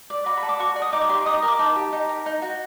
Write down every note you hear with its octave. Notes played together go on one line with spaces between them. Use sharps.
D5
F#4 B5
B5
A4
D6
F#4 C#6
D5
D#6
D#4 D6
C#6
G4 C6
D6
D#4 D#6
D#6
A#4
D6
D#4 A5
G4
D#4
A#4
D#4
F#4